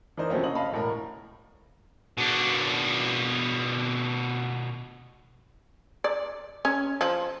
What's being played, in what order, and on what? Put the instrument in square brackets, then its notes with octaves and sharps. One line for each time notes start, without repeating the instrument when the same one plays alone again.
[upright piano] E3 D4 D#4 A#4 C5
C3 F3 F#3 A3 C4 C#4
F#1 D#5 F#7
D#5 F5 A5 B5
E1 A2 A#4
[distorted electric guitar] B2 D4
[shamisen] D5
C#4
F3